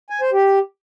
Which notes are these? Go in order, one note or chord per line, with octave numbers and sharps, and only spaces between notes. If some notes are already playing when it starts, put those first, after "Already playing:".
G#5
C5
G4